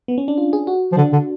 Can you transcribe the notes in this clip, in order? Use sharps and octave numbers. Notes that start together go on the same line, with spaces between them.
B3
C#4
D4
F4
G#4
F#4
F3
D3 D4
D3